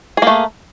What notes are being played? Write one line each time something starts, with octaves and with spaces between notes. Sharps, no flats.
A3 A#3 G#4